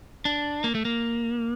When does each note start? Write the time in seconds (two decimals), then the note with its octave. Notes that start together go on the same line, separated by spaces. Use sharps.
0.25 D4
0.64 A#3
0.75 A3
0.85 A#3